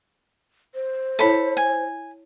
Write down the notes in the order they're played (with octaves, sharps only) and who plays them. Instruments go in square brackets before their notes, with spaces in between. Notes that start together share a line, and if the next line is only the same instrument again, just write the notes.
[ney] C5
[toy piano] E4 C#5 E5 [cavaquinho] A4 B5
[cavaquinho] G#5